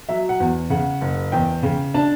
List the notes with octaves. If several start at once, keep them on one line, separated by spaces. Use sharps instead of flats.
F#3 E5
F#5
E2
C#3 F#5
F#1
E2 G5
C#3
D4 A5